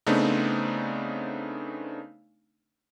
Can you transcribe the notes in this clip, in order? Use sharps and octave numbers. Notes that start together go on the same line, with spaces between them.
C#3 A3 B3 C4 D4 D#4